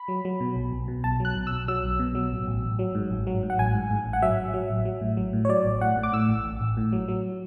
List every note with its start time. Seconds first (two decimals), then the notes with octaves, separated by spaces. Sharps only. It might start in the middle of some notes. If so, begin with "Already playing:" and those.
Already playing: B5
0.08 F#3
0.25 F#3
0.40 B2
0.56 B1
0.73 B1
0.88 B2
1.04 B1 A5
1.20 F#3 F#6
1.35 B1
1.47 B1 E6
1.68 F#3 E6
1.84 B1
1.99 B2
2.15 F#3
2.32 A1
2.47 A1
2.63 A1
2.79 F#3
2.95 G#2
3.11 A1
3.27 F#3
3.43 G#2
3.50 F#5
3.59 A1 G#5
3.74 G#2
3.90 G#2
4.07 A1
4.13 F#5
4.22 F#3 E5
4.38 A1
4.54 F#3
4.70 A1
4.85 F#3
5.01 A2
5.17 F#3
5.33 A2
5.45 C#5
5.49 F#3 D5
5.65 A1
5.81 A2 F#5
5.97 A2
6.03 D6
6.13 A2 E6
6.29 A1
6.44 A1
6.61 A1
6.77 A2
6.93 F#3
7.08 F#3